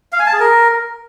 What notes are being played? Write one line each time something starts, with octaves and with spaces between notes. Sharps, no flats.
F5
G#5
A5
G#4
A#4